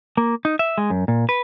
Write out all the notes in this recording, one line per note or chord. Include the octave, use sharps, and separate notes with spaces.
A#3
D#4
E5
G#3
F#2
A#2
B4